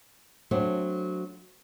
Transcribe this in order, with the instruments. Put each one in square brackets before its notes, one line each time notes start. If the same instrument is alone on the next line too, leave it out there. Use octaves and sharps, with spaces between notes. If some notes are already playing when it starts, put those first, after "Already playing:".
[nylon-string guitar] F#3 A3 C4 D4